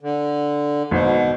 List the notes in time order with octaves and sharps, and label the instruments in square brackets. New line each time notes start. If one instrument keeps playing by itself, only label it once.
[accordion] D3
[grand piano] G#1 C5 [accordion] B2